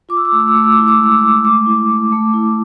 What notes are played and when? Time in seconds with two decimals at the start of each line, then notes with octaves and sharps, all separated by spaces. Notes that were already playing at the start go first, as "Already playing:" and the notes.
0.09 F4 D6
0.17 E6
0.25 D6
0.32 A3 E6
0.40 D6
0.48 E6
0.55 A3 D6
0.64 E6
0.72 D6
0.77 E4 E6
0.88 D6
0.96 E6
0.99 G#3 D6
1.11 E6
1.19 G#3 D6
1.44 A3 D6
1.66 E4
1.90 A3
2.12 A3
2.34 E4